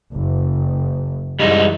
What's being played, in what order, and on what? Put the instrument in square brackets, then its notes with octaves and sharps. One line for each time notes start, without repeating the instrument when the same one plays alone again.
[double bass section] F#1
[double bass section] F#2 E3 [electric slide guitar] G3 G#3 D#4